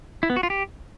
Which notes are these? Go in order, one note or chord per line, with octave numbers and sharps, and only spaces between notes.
E4
B3
F#4
F4
G4